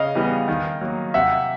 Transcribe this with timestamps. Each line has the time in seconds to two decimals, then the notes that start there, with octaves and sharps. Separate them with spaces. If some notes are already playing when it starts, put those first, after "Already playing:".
Already playing: C#3 D#5 F5
0.15 E3 G3 B3
0.48 D#3
0.81 F#3 A#3
1.14 C3 E5 F#5